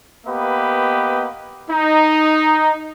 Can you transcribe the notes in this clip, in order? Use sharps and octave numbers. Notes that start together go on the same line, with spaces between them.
A#3 B3 G4 B4 D#5
D#4